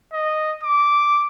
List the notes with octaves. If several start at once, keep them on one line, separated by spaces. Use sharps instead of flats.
D#5
D6